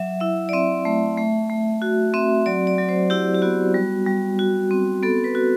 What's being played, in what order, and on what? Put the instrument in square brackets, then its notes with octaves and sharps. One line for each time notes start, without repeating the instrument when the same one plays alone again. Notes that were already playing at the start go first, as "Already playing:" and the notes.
Already playing: [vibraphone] F#3 E5
E4 E5
D5
C4 E5
A3
A3
A3
F#4
C4 E5
F#3 D5
D5
F#3
C5
E4 G4
G4
B3 F#4
G3
G3
F#4
C4
B3 A4
B4
F#4